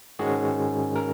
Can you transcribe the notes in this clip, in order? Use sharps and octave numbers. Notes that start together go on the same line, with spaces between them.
G#2 D#3 G#3 C#4 F#4 G#4
A#4